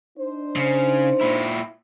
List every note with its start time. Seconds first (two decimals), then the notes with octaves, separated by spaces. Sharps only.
0.17 D4 D#4 C5
0.57 C#3
1.21 A#2 E4